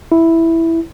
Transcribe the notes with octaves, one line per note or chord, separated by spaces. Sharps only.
E4